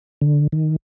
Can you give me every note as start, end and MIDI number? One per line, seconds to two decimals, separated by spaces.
0.21 0.47 50
0.52 0.76 51